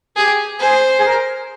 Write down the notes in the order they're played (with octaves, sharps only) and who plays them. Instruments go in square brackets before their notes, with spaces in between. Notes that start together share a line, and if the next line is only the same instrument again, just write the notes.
[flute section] G4 [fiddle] G#4
[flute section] G#4 [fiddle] C5
[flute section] G#4
A#4